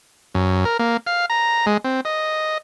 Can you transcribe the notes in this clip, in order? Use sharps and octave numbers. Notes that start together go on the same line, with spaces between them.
F#2
A#4
A#3
F5
A#5
G#3
C4
D#5